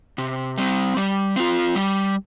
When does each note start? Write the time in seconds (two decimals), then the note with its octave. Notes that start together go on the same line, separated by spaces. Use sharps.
0.18 C3
0.58 G3 C4
0.97 G3
1.36 C4 F4
1.75 G3